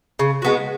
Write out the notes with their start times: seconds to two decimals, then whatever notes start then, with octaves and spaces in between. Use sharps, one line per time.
0.19 C#3
0.42 G#3 B3 F#4